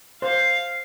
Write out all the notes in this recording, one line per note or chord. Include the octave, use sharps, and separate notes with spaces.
C5 F5